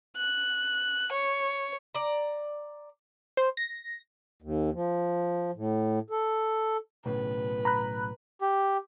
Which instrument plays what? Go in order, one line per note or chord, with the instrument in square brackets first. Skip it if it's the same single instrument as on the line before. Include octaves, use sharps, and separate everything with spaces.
[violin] F#6
C#5
[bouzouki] D5 A#5
[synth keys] C5
A#6
[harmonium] D#2
F3
A2
A4
[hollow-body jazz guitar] B1 A2 C#3 [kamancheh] B4
[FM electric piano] A#5 B5 F#6
[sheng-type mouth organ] G4